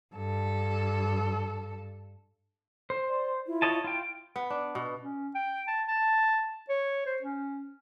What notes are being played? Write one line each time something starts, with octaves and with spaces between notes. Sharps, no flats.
G2 A4
C5
D5 C6
E4 F4
C#5 D#5 A5
E4 F4 G5
B3
D4
B2
C#4
G5
A5
A5
C#5
C5
C#4